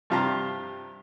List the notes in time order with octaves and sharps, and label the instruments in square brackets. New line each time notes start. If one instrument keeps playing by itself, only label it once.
[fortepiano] G2 C3 F4 G4 A5 A#5